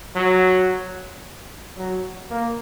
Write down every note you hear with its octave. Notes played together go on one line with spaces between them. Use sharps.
F#3
F#3
A#3